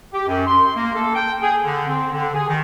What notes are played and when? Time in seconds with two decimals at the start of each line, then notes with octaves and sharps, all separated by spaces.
0.13 G4
0.28 F#2
0.47 C6
0.75 A#3
0.95 A4
1.15 G5
1.42 G#4
1.63 D3
1.88 C4
2.13 D3
2.34 G#4
2.48 D#3